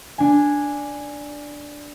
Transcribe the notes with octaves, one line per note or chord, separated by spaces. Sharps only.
D4 G#5